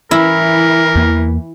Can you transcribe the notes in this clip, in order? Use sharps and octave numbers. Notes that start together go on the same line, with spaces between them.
E3 E4 A#4
E2 A#3